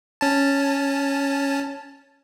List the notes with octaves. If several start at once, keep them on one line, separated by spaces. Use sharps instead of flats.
C#4 A5